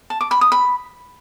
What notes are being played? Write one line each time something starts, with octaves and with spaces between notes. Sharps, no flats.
A5
D6
B5
D#6
B5